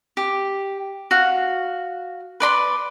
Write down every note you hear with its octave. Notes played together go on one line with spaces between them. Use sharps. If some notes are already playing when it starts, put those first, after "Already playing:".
G4
F#4 F5
B4 D5 B5 C6